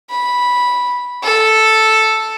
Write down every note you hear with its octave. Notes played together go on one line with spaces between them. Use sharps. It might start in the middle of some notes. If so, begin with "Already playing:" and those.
B5
A4